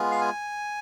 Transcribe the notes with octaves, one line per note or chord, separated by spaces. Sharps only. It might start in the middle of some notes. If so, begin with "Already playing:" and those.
Already playing: G#3 B3 F4
F5
G#5